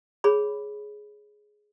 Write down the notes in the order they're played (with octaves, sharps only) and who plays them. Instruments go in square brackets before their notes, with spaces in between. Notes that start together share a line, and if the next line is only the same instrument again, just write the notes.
[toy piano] G#4 C#5 B5